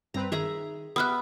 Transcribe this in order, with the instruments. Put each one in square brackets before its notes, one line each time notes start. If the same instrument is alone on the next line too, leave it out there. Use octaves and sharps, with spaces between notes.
[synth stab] G2 C4 B4 [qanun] A#5
[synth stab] D#3 [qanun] G#4 E5 A#5
[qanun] B3 E5 [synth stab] G4 [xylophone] D#6 F6 F#6